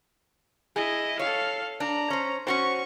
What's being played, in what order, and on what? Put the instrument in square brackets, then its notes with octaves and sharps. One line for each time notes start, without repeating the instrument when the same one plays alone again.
[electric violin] E4 D#5 [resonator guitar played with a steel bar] G#4
[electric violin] A4 F5 [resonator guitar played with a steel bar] C#5
[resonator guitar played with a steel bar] D4 [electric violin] A#5
[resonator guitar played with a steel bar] C#4 C5
[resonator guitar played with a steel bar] C#4 F#4 C5 [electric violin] C#6